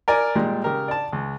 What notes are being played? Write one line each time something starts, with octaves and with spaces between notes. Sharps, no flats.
A#4 D5 G#5
A#2 G3 G#3
C#3 G4 A#4
D5 A5
C#2